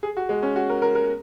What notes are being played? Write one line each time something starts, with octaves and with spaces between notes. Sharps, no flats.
G#4
F#4
G#3
C#4
F#4
A#4
A#4
A#4